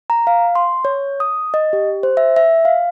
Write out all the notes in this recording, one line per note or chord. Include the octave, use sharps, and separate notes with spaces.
A#5
F5
C6
C#5
D#6
D#5
G4
C5
E5
E5
F5